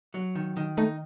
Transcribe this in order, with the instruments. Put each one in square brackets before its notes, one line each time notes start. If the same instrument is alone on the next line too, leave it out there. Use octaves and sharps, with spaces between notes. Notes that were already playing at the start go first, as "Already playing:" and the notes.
[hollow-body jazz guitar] F#3
D#3
D#3
[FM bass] A3 [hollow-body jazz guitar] D#4